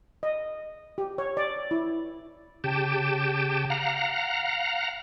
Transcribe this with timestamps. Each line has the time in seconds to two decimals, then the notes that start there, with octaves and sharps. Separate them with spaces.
0.23 D#5
0.98 G4
1.18 C#5
1.37 D5
1.71 E4
2.64 C#3 G4 G5 A5
3.70 F5 F#5 A#5